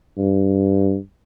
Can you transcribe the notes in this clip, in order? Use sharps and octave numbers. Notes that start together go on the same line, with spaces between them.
G2